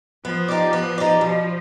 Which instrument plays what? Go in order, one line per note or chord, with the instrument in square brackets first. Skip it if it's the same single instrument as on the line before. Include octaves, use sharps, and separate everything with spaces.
[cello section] F3 [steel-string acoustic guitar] B3
[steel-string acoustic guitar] D#4 G4 D5
B3
D#4 G4 D5
[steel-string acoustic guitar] B2 [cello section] F3